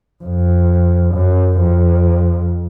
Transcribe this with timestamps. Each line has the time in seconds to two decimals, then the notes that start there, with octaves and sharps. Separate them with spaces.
0.24 F2
1.14 F#2
1.60 F2